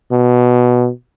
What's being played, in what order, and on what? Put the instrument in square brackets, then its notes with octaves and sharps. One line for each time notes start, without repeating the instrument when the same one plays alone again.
[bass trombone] B2